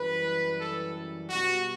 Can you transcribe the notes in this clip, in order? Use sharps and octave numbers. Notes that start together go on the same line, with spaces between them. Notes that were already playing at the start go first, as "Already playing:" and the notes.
Already playing: F#2 E3 G3 B4
A4
B2 G3 F#4